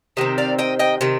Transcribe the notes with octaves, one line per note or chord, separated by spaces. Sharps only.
C3 D#3 C4 D#5
D5 F5
D#5 G5
D#5 G5
C3 D#3